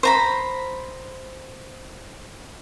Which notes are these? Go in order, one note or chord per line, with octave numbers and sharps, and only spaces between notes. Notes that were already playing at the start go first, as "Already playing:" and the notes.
C5 A#5 B5